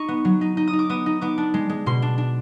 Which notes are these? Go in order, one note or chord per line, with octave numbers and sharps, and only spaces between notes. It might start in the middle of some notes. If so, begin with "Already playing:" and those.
Already playing: D#4 C#6
B3
F#3
D#4
D#4
D#6
D#4
D6
B3 D#6
D#4
B3 D6
D4
G#3
G#3
B2 C6
D4
D4